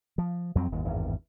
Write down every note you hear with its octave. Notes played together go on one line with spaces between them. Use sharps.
F3
F2 F#3 C4
G1 D#2 G#2
G#1 E2 G2